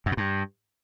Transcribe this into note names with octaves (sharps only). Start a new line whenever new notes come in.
F#2
A2
G2